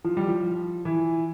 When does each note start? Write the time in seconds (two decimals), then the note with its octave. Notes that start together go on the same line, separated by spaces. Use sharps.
0.04 F3
0.17 G3
0.28 F3
0.85 E3